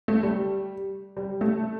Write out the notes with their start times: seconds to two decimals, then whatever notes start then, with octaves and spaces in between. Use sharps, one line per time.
0.08 A3
0.23 G3
1.17 G3
1.41 A3